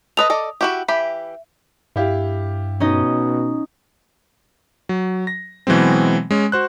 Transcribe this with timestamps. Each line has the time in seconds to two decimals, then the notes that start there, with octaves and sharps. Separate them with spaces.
0.17 A4 B4 D#5 D#6 F7
0.30 A4 D5 D#5
0.61 E4 F#4 G4
0.88 E3 G4 E5 B5
1.96 G2 E4 G4 F5
2.80 B2 C#4 D#4 D#5
4.89 F#3
5.27 A#6
5.67 B2 E3 F#3 G#3 C4
6.31 G#3 C#4
6.52 F#4 C5 F#6